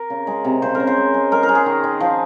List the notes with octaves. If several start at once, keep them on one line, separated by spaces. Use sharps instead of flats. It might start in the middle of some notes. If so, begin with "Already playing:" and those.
Already playing: A#4
C#3
G#3
C3
C#3 C5
A#4
C#3
C5
G#3
G#3
G#3 A#4
A#4
G#3
G#4
D#3
D#3
F3